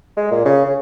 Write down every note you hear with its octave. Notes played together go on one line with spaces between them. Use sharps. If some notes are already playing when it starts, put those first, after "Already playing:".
G#3
A#2
C#3
C#3